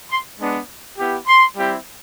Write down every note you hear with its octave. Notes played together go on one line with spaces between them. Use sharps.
C6
G#3 B3 D4
B3 E4 G4
C6
G3 C4 E4 G4